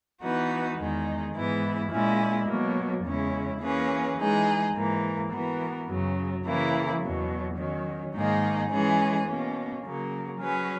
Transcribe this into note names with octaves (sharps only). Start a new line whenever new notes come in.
E3 B3 D#4 F#4 B4
E2 D#3 G#3 D#4 G#4
G#2 E3 B3 E4
A#2 G#3 C#4 E4
B2 F#3 A#3
E2 C#3 G#3 C#4 E4
E3 A#3 C#4 G#4 B4
E3 G#3 D#4 G#4
G#2 E3 A#3
E3 B3 F#4 A#4
F#2 C#3 F#3
C#3 E3 A#3 E4
E2 B2 F#3
D#3 F#3 C#4
G#2 D#3 A#3 D#4 G#4
E3 G#3 C#4 G#4
B2 A#3 C#4
C#3 F#3 A#3
F#3 C#4 G#4 B4